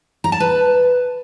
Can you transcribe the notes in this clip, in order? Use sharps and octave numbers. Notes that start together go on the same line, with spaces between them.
A#5
A5
B4